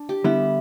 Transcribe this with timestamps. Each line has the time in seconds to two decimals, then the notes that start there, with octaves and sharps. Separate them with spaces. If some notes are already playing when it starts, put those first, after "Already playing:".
Already playing: D4
0.09 G4
0.24 D3 G3 B3 E4